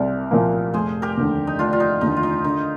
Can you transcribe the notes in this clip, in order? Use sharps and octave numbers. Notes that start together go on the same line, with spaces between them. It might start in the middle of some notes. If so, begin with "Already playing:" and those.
Already playing: C2 A#4 C5 D5
A#2 F3 A#3
F1 G#4 C5
G4 A#4
D#2 D3
D#4
F1 D4 F4
F4
D#4
D#2 D3 D#4
F4
D#4
D3 D#4